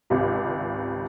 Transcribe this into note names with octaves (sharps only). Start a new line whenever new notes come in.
G#1 C#2 C3